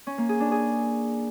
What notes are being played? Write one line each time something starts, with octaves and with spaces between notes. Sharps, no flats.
C#4
A#3
G#4
D4
G#4